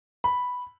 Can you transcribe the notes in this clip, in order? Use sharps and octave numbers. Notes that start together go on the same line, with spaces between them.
B5